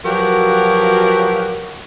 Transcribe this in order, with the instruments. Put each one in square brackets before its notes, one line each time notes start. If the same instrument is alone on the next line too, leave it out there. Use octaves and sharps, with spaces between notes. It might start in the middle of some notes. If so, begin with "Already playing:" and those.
[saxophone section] F3 F#3 F#4 G4 A#4 B4